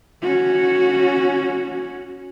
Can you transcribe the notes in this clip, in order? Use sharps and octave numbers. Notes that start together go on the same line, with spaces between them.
C#4 F#4